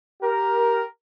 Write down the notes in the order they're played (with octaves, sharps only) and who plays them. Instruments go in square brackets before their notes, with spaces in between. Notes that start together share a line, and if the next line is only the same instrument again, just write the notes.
[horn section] G4 A#4